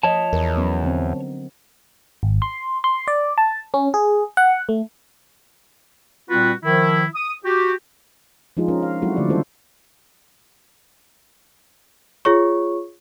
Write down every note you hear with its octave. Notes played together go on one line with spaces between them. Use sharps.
F3 C#5 D#5 A5
E2 A#4
F#3 B3 C#4
D3 C4
G#1
C6
C6
D5
A5
C#4
G#4
F#5
A3
A#2 G3 C4 F4 F#4 B4
D#3 F3 E4
D#6
F#4 G4
F3 G#3 D4 D#4 F4 G#4
C#4 D#4 A#4
F5
F#3 G#3 C4 E4 F#4 A4
D3 F3 A3 D5
D#3 G3 C#4 E4 A4 C5
F4 G#4 C#5 C#6